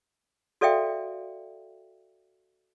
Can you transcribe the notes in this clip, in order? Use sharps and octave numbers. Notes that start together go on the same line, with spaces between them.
F#4 A4 D5 E5 F5 G5